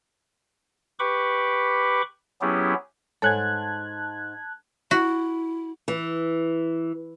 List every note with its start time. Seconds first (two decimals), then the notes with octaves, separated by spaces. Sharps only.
1.00 G4 B4 B5 C#6 D6
2.41 F#3 B3 C#4 E4 G4 G#4
3.22 G#2 A4 C#5 G#5 A5 F#6 G#6
4.91 E4 F#4
5.88 E3